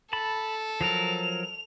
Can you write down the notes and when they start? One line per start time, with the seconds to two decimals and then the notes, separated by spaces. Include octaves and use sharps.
0.13 A4 A5 B5
0.81 F3 F#3 A#4 F7